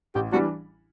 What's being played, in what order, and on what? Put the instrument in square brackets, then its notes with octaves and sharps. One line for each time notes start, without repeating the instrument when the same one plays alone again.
[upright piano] A1 [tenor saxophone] G4
[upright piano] E3 G3 D4 [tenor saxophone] F#4